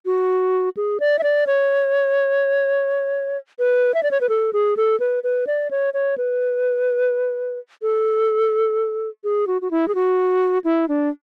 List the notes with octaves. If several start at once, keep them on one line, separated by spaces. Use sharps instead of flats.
F#4
G#4
D5
E5
D5
C#5
B4
E5
D5
C#5
B4
A4
G#4
A4
B4
B4
D5
C#5
C#5
B4
A4
G#4
F#4
F#4
E4
G#4
F#4
E4
D4